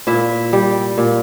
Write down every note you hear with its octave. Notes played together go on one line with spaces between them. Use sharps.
A#2 E4 E5
G3
A#2